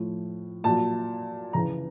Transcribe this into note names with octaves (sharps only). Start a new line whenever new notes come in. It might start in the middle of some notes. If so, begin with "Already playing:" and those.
Already playing: A2 F3
A#2 F#3 A5
C#3 E3 A#5